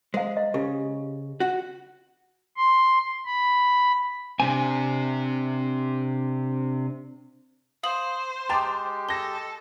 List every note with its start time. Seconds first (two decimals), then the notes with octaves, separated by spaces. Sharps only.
0.14 G#3 C5 F5
0.37 D#5
0.54 C#3 G4
1.40 F#4 F#5
2.57 C6
3.26 B5
4.40 C3 C4 D4 G#5
7.83 C5 F5 D#6 F#7
8.49 G#3 G4 G5 A5 A#5 C6 D6 A6
9.09 A4 A5 A#6 G7